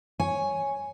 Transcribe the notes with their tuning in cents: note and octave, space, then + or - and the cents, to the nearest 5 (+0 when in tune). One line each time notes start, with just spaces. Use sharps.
C#5 +0 G#5 +0